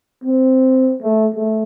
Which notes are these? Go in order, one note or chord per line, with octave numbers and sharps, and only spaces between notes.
C4
A3
A3